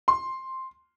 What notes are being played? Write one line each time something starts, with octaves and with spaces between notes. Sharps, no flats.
C6